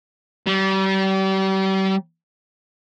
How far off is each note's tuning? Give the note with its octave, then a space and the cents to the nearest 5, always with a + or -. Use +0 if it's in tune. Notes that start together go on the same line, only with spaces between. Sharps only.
G3 -35